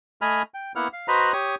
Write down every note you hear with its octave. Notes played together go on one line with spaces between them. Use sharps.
A3 D#5 G#5 B5 F6
G5
A#3 B3 E4 F#5 F6
F5
F#4 B4 C5 D#5 A#5 B5
G4 C#5 D#6